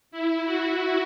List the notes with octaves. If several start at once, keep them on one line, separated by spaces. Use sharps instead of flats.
E4
F#4